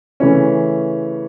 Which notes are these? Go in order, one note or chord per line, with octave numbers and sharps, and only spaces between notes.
C#3 E3 A3 C#4